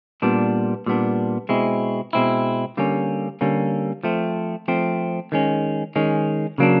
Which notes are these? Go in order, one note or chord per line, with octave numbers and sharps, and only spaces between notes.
A#2 G3 B3 D4
A#2 G3 B3 D4
B2 G#3 C4 E4
B2 G#3 C4 E4
D3 G3 A#3 C#4
D3 G3 A#3 C#4
F3 A3 C4
F3 A3 C4
D#3 G#3 C#4
D#3 G#3 C#4
C#3 F#3 A#3 D4